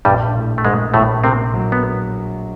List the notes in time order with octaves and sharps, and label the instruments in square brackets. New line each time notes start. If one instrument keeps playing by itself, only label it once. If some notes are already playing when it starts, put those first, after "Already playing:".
[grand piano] A#1 [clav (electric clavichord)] G2 G3
[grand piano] A2
[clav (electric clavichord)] A3
[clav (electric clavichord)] G#2 G#3 [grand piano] A#3
[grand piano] A#1 [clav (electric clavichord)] A2 A3
[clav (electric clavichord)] C3 C4 [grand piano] A#3
[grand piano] F#3
[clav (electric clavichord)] B3